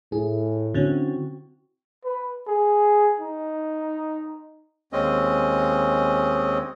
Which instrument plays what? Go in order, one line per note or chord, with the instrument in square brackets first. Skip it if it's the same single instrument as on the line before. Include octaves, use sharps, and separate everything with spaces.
[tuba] A2 [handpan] E4 [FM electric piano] G#4
[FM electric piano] D3 C#4 [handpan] C4 F#4
[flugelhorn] B4
G#4
D#4
[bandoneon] D#2 G#3 C4 C#4 D#5